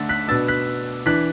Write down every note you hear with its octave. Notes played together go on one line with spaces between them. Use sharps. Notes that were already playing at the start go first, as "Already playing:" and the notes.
Already playing: D3 A3 D4 E6 A6
F#6 B6
B2 B3 D4 E6 A6
F#6 B6
E3 D4 F#6 B6